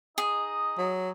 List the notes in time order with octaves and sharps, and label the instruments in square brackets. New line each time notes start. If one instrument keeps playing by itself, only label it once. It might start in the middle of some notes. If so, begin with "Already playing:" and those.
[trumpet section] D#4 D#5 [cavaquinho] G#4
[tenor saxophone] F#3